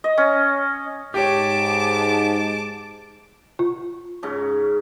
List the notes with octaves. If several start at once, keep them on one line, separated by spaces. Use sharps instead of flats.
D#5
C#4
G#2 G4 C#5 A5 D6
F4
G#2 C#3 C#4